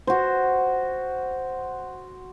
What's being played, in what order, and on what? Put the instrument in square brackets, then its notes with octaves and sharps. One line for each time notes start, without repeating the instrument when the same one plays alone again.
[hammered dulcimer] F#4 C5